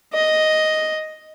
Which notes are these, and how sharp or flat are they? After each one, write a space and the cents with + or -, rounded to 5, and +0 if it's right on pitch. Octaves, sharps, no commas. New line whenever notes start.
D#5 +5